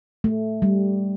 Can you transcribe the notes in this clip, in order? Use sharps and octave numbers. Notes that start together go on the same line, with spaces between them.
A3
G3